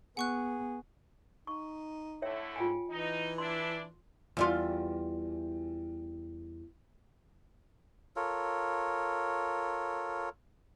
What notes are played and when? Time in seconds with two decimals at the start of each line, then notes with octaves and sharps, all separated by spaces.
0.17 B3 G#4 F#5 C#6 F#6
1.47 D#4 C#6
2.22 D3 A3 E4 C#5 E5 G5
2.56 G#2 F4 G5 G#5
2.89 E3 D#4
3.38 D4 E4 C6
4.37 E2 G3 F4
8.16 F4 A4 A#4 C#5